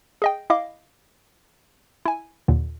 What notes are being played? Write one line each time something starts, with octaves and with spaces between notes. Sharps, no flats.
G#4 D#5 G5
E4 D#5 F5 D6
E4 G#5
D#2 A#2 D3